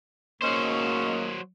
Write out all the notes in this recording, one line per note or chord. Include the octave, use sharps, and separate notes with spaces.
G#2 F#3 A#3 C#4 C5 D#5